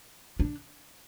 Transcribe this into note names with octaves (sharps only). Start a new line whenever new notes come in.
D4